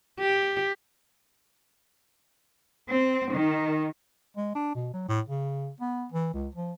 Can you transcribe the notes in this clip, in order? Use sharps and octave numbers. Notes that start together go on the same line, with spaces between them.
G4
C4
D#3
G#3
D4
B2
F#3
A2
C#3
B3
E3
C#2
F3